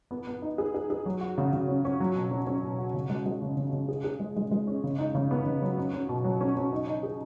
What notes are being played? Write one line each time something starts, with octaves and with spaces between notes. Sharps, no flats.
B3
B3
D#4
G#4
G#4
G#4
F#3
F#4
C#3
C#3
C#4
C#4
F#3
B2
C#4
C#4
B2
F#4
C#3
G#3
G#3
C#3
C#3
C#3
G#4
G#4
G#3
G#3
G#3
C#4
C#3
D#4
C#3
B3
C#3
F#3
C#4
C#4
B2
F#3
C#4
C#4
D#4
D#4
G#4